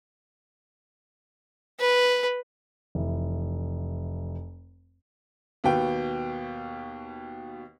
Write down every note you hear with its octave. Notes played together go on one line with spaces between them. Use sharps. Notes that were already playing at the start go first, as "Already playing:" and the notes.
B4
F1 E3
D#2 B2 B4 G5